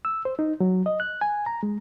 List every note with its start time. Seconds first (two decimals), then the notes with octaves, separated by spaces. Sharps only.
0.05 E6
0.25 C5
0.39 D#4
0.60 F#3
0.86 D#5
1.00 F#6
1.21 G#5
1.46 A#5
1.63 G#3